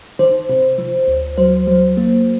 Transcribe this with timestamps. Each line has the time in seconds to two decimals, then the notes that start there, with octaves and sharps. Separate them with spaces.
0.19 D#3 C5
0.49 C3
0.78 F3
1.07 D2
1.38 F#3 C5
1.67 F#3
1.97 A#3